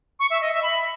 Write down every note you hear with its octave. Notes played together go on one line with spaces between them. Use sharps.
C#6
E5
D#5
E5
B5